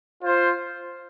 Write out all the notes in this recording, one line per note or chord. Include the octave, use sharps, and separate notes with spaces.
F4 C5